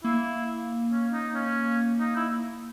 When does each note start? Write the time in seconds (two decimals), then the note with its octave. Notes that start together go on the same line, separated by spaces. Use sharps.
0.04 A#3 E4
0.90 C#4
1.12 D#4
1.34 C#4
2.00 D#4
2.16 E4